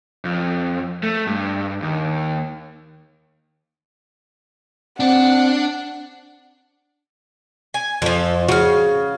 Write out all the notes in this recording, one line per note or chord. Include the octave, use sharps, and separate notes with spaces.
F2
A3
G2
D#2
C4 D4 D5 F#5
G#5
F2 F3 A4
C#3 F#4 F5